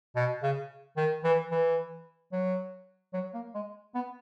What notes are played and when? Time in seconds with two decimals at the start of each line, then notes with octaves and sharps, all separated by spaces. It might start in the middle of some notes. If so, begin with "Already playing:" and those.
0.16 B2
0.43 C#3
0.97 D#3
1.24 E3
1.51 E3
2.32 F#3
3.14 F#3
3.34 A#3
3.54 G#3
3.95 B3